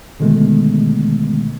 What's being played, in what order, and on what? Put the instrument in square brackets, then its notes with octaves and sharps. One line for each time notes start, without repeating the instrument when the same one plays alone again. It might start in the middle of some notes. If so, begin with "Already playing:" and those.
[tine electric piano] B2 D3 D#3 G#3 A3 B3